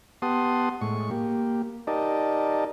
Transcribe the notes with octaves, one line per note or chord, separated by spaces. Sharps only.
B3 G4 F#5 A5 C6 D#6
A2 G#3 C#6
A#3 G4
D#4 G4 A#4 D5 D#5 A5